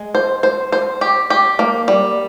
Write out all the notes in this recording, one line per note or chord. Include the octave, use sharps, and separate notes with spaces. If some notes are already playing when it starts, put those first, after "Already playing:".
Already playing: G#3
C5
C5
C5
G4
G4
A#3
G3